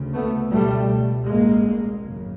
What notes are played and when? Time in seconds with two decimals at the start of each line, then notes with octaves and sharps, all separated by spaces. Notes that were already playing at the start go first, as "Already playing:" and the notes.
Already playing: D2 C#3
0.14 A3 B3
0.51 C#2 B2 G3 A3
1.27 A1 A2 G#3 A#3
2.02 G#1 F#2 C#3